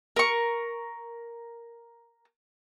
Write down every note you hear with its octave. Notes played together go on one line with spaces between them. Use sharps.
A#4 C#6